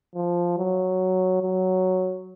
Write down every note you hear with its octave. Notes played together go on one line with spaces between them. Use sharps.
F3
F#3
F#3